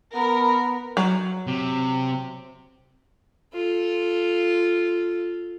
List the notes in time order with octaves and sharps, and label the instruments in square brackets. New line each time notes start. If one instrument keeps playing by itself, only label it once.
[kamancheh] B3 B5 [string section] A#4
[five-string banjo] F#3
[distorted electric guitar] C3
[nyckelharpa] F4 A4